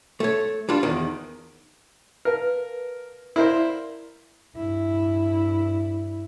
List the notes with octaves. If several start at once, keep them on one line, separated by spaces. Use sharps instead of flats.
A3 C#5
G3 D4 F4
E2 D#3
A#4 B4 F5 A5
E4 A#4 C5 D5 F5
G2 E4